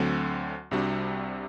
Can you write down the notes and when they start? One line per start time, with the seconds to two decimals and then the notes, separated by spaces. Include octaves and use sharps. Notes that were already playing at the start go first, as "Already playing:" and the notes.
Already playing: D2 D3 F#3 A3 C4
0.71 C2 C3 G3 D4 F#4